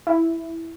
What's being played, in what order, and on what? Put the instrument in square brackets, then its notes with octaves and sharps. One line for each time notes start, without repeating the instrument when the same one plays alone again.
[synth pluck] E4